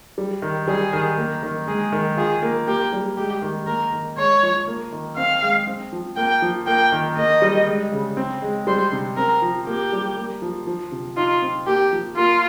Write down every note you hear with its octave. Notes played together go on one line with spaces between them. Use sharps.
G3
D#3
G3 G#4
D#3
A#3
D#3
G#3 G#4
D#3
F4 G#4
A#3
A#3 G4
G3
G#3 G4
D#3
A#3 A#4
D#3
G#3 C#5
F3
A#3
D#3
C4 F5
G#3
C4
F3
A#3 G5
F3
A#3 G5
D#3
A#3 D#5
G3
G#3
C#3
C4
G#3
G3 C5
C3
C4 A#4
F3
A#3 G4
G3
A#3
F3
F3
C3
D#4 F4
C4
A#3 G4
F3
A#3 F4